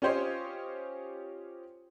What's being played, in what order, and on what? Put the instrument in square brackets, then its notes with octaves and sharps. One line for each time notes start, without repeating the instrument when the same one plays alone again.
[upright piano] C#4 F4 G4 C5 C#5 D#5